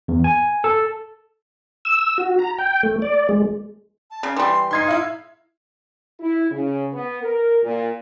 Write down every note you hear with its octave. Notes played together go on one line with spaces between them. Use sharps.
E2
G#5
A4
E6
F#4
A#5
G5
A3
D5
G#3
A5
C#3
E3 G3 C6
D#4 C6 G#6 C7
E4 F5
E4
C#3
B3
A#4
A#2